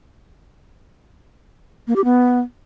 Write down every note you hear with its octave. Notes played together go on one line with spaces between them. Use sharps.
A#3
G4
B3